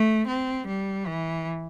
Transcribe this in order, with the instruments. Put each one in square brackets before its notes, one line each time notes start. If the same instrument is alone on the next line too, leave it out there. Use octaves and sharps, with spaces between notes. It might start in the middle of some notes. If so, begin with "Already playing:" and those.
Already playing: [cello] A3
C4
G3
E3